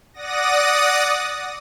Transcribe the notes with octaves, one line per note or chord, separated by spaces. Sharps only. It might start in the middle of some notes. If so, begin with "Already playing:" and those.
D5 F#5 D#6 A#6